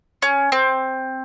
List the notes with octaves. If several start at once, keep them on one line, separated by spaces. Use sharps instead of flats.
C#4
C4